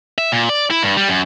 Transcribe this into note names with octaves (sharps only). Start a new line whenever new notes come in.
E5
A#2
D5
E4
G2
G3
F#2